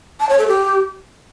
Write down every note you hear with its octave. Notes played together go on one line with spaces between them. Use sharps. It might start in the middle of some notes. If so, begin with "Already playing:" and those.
A5
C#5
A4
G4